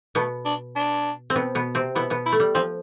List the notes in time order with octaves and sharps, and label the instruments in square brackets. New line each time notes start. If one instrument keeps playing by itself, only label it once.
[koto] B2 B3 [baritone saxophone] A3
[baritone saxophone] D4
D4
[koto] C4
B2 B3
B2 B3
C3 C4
[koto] B2 B3 [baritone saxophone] E4
[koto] B2 B3
[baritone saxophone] E4
[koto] A3
G3
[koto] F3 [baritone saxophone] C4